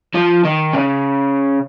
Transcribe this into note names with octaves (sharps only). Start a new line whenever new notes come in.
F3
D#3
C#3